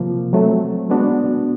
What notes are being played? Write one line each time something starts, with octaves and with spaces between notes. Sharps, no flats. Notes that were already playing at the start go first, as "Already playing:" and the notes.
Already playing: C3 F3 A#3
F#3 A3 C4
G#3 B3 D4 F#4